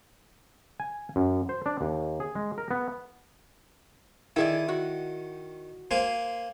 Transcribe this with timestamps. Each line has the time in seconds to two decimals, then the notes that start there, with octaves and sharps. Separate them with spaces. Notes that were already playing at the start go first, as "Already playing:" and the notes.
0.80 G#5
1.16 F#2
1.49 C5
1.66 D4
1.81 D#2
2.20 G#4
2.36 G#3
2.58 A#4
2.71 B3
4.36 D#3 E4 G#4 D5
4.68 F#4
5.91 A#3 C5 G#5